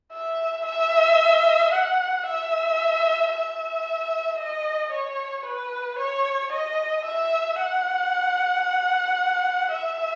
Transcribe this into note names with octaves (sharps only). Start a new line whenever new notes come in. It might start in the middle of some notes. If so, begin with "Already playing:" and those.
E5
E5
F#5
E5
E5
D#5
C#5
B4
C#5
D#5
E5
F#5
E5